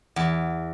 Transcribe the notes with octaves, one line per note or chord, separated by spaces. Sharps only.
E2